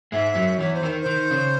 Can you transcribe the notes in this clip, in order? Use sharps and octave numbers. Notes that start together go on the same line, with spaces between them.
G#2 G#3 E5
F#2 F#3
E2 E3 C#5
C5
D#3
C5
D#3
C#3